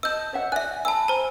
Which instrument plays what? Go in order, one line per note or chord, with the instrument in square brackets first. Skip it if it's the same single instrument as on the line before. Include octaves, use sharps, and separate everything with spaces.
[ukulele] D#5 A5 [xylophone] E6 G6
[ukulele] C#5 E5 F#5
[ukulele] D5 G#5 [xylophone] E5 F#6
[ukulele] G#5 B5 [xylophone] A5 E6
[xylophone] C5 A#5